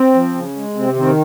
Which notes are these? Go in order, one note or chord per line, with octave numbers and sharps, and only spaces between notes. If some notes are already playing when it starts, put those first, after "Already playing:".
Already playing: C4
F3
C#3
G#3
C3 C4
D#3 C4